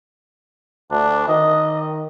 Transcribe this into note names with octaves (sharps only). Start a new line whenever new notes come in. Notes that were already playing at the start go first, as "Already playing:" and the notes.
D2 D4
D#3 D#5